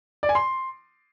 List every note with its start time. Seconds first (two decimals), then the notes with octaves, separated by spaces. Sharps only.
0.23 D5
0.29 G#5
0.35 C6